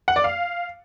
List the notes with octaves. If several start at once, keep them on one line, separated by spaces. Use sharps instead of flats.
F#5
D5
F5